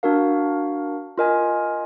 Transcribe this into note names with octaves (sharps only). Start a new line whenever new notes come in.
D4 F#4 A#4 F5
F4 A#4 D#5 G#5